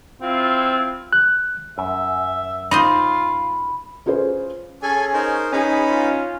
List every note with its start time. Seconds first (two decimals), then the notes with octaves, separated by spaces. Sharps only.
0.21 C4 E4 F4
1.13 F#6
1.78 F#2 E5
2.71 D#4 F4 C5 D#5 B5
4.06 C#4 F4 G#4 B4 C5
4.83 C#4 G#4 A4 G#5
5.14 D#4 A#4 C5
5.53 C#4 D#4 G#4 B4 B5
5.89 F4